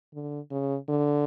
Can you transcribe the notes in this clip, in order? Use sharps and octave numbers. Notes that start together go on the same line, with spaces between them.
D3
C#3
D3